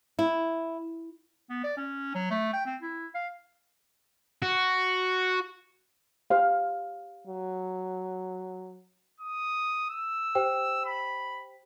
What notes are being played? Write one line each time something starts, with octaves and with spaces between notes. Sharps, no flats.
E4
B3
D5
C#4
F#3
A3
G5
C4
E4
F5
F#4
G4 C5 F5
F#3
D#6
E6
G4 C5 G5
B5